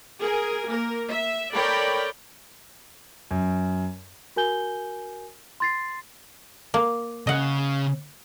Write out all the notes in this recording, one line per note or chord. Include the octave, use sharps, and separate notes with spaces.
G#4 A#4 G#5
A#3 A#4
E5
A4 A#4 C#5 D5 G5 B5
F#2
F#4 A#4 G#5 G6 G7
C6 A6 C7
A#3
C#3 D#5 F#5